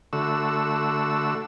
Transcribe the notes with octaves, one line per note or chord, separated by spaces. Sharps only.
D3 A3 F#4 E6